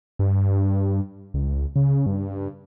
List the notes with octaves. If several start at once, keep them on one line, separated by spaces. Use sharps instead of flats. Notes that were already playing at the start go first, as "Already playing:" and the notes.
G2
C#2
C#3
G2